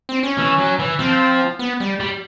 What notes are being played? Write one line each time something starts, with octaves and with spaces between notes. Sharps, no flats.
C4
C#4
E3
F#3
E3
F3 C4
B3
G3
G3